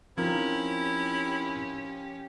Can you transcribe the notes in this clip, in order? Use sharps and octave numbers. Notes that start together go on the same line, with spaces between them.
F3 C4 C#4 D#4 E4 G4 A#4